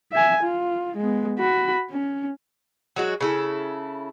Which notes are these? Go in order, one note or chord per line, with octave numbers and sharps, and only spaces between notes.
E5 G#5
F4
G#3 B3
F#4 B5
C#4
F#3 G#3 F#4
C#3 E4 A4